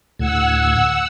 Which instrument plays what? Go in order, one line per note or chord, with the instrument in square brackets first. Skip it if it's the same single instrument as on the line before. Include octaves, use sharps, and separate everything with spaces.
[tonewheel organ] D2 A2 G#6 [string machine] F#5 E6